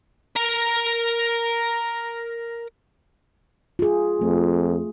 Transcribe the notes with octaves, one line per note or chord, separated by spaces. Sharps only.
A#4 A#5
F4 G#4
F2 A3